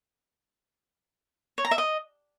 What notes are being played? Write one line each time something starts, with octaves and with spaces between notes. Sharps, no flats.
C#5
A#5
E5
D#5